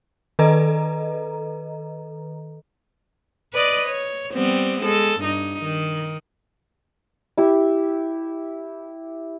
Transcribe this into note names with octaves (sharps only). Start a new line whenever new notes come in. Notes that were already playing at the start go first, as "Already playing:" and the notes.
D#3 A4 B4 D#5 A#5
B4 D5 D#5
C#5
G3 B3 C4
G#3 A4
G2 D#4
D#3
E4 G4